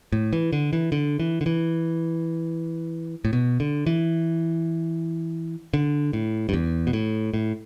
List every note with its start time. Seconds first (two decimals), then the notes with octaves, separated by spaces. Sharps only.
0.13 A2
0.33 E3
0.53 D3
0.73 E3
0.92 D3
1.20 E3
1.41 D3
1.46 E3
3.25 A2
3.33 B2
3.60 D3
3.87 E3
5.74 D3
6.13 A2
6.49 G2
6.53 E2
6.87 B2
6.93 A2
7.34 A2